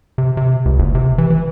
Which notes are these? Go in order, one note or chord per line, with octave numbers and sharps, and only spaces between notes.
C3
C3
C#2
F#1
C3
E3
E3